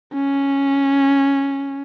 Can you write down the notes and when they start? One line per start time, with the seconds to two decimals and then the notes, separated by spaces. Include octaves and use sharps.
0.14 C#4